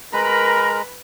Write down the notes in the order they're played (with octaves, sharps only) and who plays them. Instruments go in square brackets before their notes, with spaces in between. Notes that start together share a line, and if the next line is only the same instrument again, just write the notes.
[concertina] G#3 A#5 [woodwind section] A#4 [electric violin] B4 B5